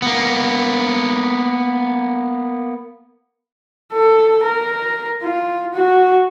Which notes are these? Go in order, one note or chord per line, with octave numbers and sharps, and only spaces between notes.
A#3 B3
A4
A#4
F4
F#4